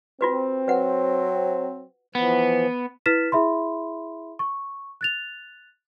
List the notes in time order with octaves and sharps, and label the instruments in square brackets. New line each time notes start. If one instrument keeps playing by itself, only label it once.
[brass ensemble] C4 [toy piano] F4 F#4 B4
[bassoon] F#3 [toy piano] B4 F#5
[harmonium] E3 F3 [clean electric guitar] B3
[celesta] E4 B4 F6 A6 B6 E7
E4 G#4 E5 B5 C6
C#6
F#6 A6 F7